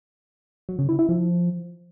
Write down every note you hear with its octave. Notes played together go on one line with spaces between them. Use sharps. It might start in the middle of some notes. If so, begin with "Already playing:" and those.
F#3
C#3
E4
E4
F3